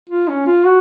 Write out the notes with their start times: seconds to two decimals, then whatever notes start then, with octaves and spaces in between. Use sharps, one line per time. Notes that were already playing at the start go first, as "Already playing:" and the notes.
0.10 F4
0.28 C#4
0.46 F4
0.65 F#4